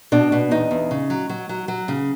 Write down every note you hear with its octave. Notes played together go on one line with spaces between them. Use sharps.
B2 D4
B2
E2 D#4
E2
C#3
F#3
F#3
F#3
F#3
C#3